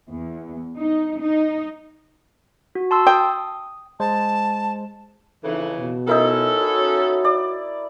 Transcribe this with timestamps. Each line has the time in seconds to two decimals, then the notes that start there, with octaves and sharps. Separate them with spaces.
0.11 E2
0.79 D#4
1.20 D#4
2.75 F#4
2.91 A5 C6 E6
3.07 G5 D#6
4.00 G#3 C5 A5
5.44 F2 C#3 E3 D#4 A4
5.77 B2
6.07 C#4 D#4 E4 A4 A#4
6.59 F#4 C#5
7.25 D5